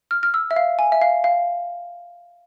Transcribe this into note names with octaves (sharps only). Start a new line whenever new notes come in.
F6
F6
E6
E5
F5
G#5
E5
F5
F5